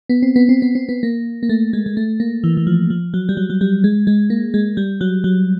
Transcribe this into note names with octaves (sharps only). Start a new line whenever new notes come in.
B3
C4
B3
C4
B3
C4
B3
A#3
A#3
A3
G#3
G#3
A3
A#3
E3
E3
F3
F3
F#3
G3
F#3
F#3
G3
G#3
G#3
A#3
G#3
G3
F#3
F#3